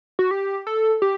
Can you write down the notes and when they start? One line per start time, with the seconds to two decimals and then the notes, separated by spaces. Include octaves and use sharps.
0.19 F#4
0.31 G4
0.67 A4
1.02 G4